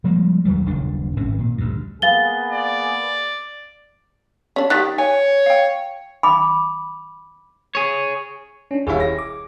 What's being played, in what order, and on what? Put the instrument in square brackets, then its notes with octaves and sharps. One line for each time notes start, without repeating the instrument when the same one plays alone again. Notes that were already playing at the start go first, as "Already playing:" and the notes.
[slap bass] F3 G3 G#3 A#3
D#2 D#3 F#3 G3
D#1 B1 C#3 D4
G#1 A2 C4 C#4
A#2
D2 G2
[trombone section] A#3 B3 G#4 [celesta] F5 A6 G7
[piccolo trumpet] D5
[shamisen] C#4 D4
[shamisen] D#3 G4 [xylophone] F#6 A6 B6
[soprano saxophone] C#5 [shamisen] G#5
[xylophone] F5 G5
[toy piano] B5 D6
[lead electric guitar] G#4 C#5
[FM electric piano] C#4 D4
[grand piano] D#1 E4 [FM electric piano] G#4 C#5 F5
[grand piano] A#6
[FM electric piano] D6